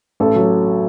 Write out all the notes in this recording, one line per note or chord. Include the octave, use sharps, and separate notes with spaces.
A1 A4
F#3